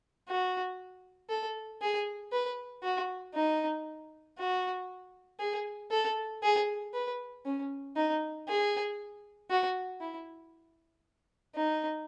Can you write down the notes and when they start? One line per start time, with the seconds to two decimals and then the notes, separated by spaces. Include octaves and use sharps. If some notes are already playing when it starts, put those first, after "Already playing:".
0.28 F#4
1.29 A4
1.81 G#4
2.32 B4
2.83 F#4
3.35 D#4
4.38 F#4
5.39 G#4
5.91 A4
6.42 G#4
6.94 B4
7.46 C#4
7.96 D#4
8.48 G#4
9.50 F#4
10.01 E4
11.55 D#4